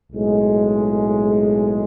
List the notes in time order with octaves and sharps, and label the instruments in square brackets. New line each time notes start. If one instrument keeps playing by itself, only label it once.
[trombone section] B1 A2 G#3